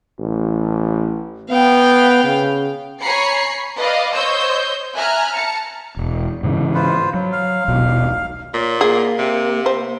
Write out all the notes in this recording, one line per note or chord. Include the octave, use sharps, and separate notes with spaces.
A1
B3 F5 G5
C#3
C#5 G#5 A#5 B5 C7 C#7
B4 D5 D#5 F5
C5 C#5 D#5 E6 G6
E5 G#5 A#5 F6 F#6
A5 A#5 C#7
E1
G#2 C#3 E3
F4 B4 C5
F#3
F5
D#1 B1 B2
A#2 C#5
A#3 G#4
C3
C5